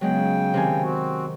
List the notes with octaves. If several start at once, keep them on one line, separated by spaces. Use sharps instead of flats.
C#3 F#3 G#3 B3 G5
C3 D#3 G#5
C4 F#4